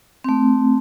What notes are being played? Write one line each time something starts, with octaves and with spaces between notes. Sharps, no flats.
A3 C4